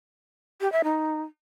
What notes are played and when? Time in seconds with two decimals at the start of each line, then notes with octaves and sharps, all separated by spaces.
0.61 G4
0.72 E5
0.84 D#4